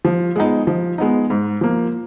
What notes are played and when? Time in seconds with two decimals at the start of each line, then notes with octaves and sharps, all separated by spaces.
0.05 F3
0.36 G#3 B3 D#4
0.67 F3
0.98 G#3 B3 D#4
1.30 G#2
1.61 F3 A#3